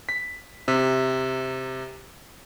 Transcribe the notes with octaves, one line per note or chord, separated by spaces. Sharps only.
B6
C3